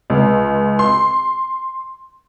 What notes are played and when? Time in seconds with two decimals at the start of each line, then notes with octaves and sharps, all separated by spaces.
0.10 C#2
0.79 C6